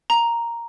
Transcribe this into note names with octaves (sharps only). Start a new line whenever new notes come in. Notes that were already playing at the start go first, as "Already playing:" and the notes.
A#5